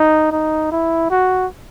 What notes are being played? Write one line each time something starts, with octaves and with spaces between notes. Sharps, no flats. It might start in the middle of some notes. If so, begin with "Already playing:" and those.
Already playing: D#4
D#4
E4
F#4